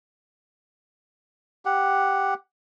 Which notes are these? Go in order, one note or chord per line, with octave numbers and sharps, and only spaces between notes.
G4 F#5